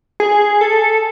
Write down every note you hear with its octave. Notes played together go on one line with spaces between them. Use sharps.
G#4
A4